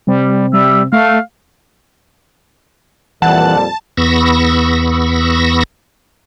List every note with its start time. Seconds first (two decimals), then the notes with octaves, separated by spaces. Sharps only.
0.07 C3 G3 C4
0.53 G3 E5
0.93 A3 F5
3.22 F2 A#2 E3 G3 F#5 A5
3.97 E2 B3 B5 C#6 E6 A#6